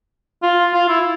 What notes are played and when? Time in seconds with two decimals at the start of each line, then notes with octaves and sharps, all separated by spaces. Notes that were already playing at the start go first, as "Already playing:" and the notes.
0.43 F4
0.74 F4
0.89 E4